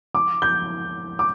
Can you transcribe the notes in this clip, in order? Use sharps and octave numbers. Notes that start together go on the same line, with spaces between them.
D6
G6
D6